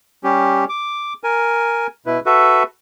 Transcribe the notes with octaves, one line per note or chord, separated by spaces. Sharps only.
G3 C#4 G4
D6
A#4 G#5
B2 E4 B4
F#4 A4 B4 E5